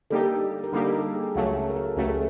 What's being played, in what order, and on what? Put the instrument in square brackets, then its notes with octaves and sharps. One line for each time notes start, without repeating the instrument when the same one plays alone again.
[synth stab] D3 G3 A#3 D#4 G4 [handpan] A4
[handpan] A#4
[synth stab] D3 G3 A#3 D#4 G4 [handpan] A4
[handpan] A4
G#4
[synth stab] C#2 C#3 F#3 A3 [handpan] F#4
[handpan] A4
A#4
A4
[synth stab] C#2 C#3 F#3 A3 [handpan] G4
[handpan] G#4